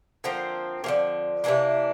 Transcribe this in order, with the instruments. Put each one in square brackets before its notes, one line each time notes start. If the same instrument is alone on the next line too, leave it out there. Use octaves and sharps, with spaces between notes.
[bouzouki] D3 F3 A#3 C4
D3 F3 A#3
C3 E3 A#3 D4